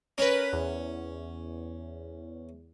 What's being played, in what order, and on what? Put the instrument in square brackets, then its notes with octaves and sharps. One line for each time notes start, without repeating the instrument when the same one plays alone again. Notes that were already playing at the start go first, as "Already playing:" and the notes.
[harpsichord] C#4 [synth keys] A#4 B4
[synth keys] E2